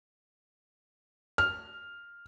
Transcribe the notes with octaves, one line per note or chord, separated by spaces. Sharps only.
F6